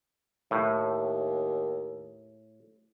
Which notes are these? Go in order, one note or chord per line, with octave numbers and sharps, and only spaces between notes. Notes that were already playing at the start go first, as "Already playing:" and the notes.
D#2 A2